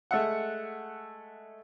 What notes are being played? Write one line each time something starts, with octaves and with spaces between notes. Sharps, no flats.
G#3 A3 E5 F#5